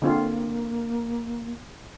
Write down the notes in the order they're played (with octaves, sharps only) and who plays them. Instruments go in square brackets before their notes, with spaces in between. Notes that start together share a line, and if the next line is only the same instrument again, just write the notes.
[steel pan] D3 C4 F4 [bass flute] A#3